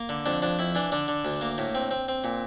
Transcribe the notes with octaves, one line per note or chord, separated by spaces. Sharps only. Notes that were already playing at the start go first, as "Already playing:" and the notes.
Already playing: A#3
D3
F2 D4
F2 D4
F2 E4
E3 D4
D3 D4
D3
D2
A#3
A2
C4
C4
C4
A#2